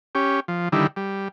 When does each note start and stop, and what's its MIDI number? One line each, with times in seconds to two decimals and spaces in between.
0.15 0.40 61
0.15 0.40 67
0.48 0.69 53
0.72 0.87 50
0.72 0.87 51
0.72 0.87 55
0.72 0.87 64
0.96 1.28 55